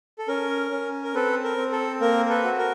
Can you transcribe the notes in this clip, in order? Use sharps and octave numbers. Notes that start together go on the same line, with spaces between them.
A4
C#4 A#4
C#4
A#4
C4 A4 B4
A#4
C4
A4
A#3 A#4
A4 B4
F#4
A#4